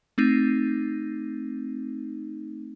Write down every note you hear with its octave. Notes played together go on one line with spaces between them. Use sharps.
A3 C4 D#4